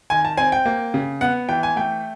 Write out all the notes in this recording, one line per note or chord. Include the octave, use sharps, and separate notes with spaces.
D#3 G#5
A5
C4 G#5
G5
A#3
C#3
B3 F#5
E3 G5
G#5
A3 G5